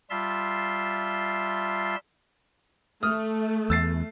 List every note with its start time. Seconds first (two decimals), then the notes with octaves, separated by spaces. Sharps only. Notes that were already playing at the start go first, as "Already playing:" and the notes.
0.10 G3 F4 E5 A5 C6
3.03 A3 D#6 F6
3.70 E2 E6 A6 C7